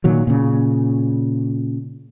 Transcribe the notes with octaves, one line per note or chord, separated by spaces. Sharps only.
A#2 D#3 F#3
A#2 C#3